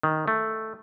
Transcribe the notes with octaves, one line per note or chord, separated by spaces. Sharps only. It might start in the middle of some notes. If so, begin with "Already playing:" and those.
D#3
A3